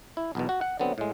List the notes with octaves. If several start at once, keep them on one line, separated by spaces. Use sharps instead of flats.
E4
B1 E2 B2
F#4
F#5
D3 F#3 B3 C4
A2 G#3